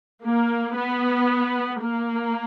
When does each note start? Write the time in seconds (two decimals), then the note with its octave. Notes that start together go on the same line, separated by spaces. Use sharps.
0.24 A#3
0.76 B3
1.82 A#3